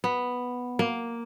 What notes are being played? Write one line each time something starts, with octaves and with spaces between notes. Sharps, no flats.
B3
A#3